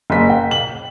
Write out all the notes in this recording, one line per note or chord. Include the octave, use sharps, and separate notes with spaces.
F#1 B6
G5
F#7